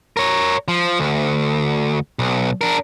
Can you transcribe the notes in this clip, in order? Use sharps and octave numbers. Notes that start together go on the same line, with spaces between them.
A#4 C#5
F3
D2
B1
D4 A#4